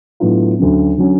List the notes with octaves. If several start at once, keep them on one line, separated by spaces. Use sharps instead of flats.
A2 F#3 B3 D4 F4
D2 D3 F#3 C#4
D3 F#3 C#4